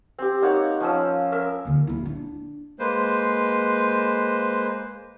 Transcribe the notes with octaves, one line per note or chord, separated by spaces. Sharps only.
C4 G4
A#3 D#4 C#5 F#5
F3 C#4 E6
A#4 E5 E6
D#2 D3
D#1 E4
D4
G#3 A#3 B4 C5